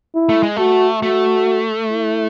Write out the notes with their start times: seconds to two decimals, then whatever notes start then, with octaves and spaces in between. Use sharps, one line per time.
0.15 E4
0.29 A3
0.43 G#3
0.56 A3 F#4
1.02 A3 F#4
1.89 E4